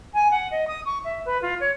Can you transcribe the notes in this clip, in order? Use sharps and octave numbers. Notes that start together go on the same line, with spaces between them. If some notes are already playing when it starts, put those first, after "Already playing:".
G#5
F#5
D#5
D#6
C#6
E5
B4
F4
C#5